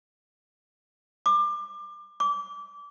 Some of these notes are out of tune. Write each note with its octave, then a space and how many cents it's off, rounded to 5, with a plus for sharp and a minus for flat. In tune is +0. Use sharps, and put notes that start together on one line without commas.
D6 +25
D6 -25